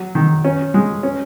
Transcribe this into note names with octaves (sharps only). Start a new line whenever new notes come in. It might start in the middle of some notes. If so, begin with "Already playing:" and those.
Already playing: F#3
D#3
C#4
G#3
C#4